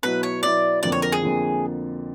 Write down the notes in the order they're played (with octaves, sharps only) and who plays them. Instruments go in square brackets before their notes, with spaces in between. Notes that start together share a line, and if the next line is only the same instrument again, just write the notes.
[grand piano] B2 F#3 B3 E4 [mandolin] B4
[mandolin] C#5
[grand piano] B2 F#3 B3 E4 [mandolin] D5
[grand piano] F2 D3 F3 A#3 [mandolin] D5
[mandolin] C#5
A#4
G#4
[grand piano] F2 D3 F3 A#3